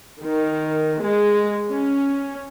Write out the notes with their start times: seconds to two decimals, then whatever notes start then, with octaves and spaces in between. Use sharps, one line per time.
0.20 D#3
1.00 G#3
1.71 C#4